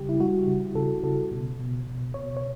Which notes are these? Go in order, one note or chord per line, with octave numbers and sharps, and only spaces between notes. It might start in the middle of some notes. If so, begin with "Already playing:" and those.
Already playing: C#3 G3 G4
E4
G3 F#4
C#3
C#3 A4
C#3 A4
B2
B2
B2
B2 C#5
C#5